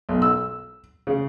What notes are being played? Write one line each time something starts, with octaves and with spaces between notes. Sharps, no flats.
B1
E6
C#3